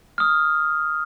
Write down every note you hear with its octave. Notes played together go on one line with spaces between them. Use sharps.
D#6 F6